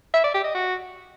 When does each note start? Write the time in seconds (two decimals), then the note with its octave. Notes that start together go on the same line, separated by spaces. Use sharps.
0.14 E5
0.24 D5
0.34 G4
0.44 D#5
0.55 F#4